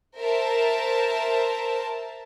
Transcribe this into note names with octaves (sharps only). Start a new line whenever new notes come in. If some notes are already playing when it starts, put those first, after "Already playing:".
A#4 C5 E5 A5